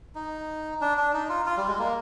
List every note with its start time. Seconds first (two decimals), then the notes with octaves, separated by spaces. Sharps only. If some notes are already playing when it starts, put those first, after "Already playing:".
0.15 D#4
0.81 D4
0.97 D4
1.14 D#4
1.29 F4
1.46 F4
1.57 G3
1.69 G#3
1.79 A#3